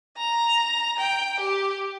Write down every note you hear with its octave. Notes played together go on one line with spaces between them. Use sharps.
A#5
G5
G4